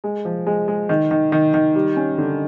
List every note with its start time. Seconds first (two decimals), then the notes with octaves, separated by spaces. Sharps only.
0.04 G#3
0.25 F3
0.47 G#3
0.68 G#3
0.89 D#3
1.11 D#3
1.32 D#3
1.54 D#3
1.75 G3
1.97 C#4
2.18 D3